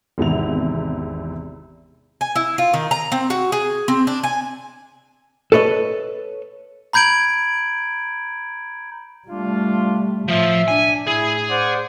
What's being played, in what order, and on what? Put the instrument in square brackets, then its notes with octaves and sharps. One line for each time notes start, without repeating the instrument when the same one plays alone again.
[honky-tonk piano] G#1 E2 C3 F7
[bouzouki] G#5
E4
F4
D#3
A#5
C4
F#4
G#4
C4
D4
G#5
[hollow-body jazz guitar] A4 B4 C#5 D#5
[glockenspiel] A#5 B5 G6 G#6 D7 F#7
[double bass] G3 A3 [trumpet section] D4 F4
[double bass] A2 [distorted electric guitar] F3 [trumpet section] E5
[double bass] D4 [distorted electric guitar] G#5
[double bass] A2 [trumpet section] E4 [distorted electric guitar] G#4
[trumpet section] C5 D5 F#5